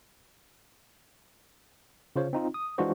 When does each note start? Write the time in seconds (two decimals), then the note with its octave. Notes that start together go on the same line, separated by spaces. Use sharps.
2.16 C#3 F4 C5 C#5
2.33 C4 D#4 F4
2.54 D#6
2.78 E3 G#3 D4 F4 F#4 C5